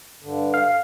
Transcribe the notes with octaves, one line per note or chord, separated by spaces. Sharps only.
G2 D3
F5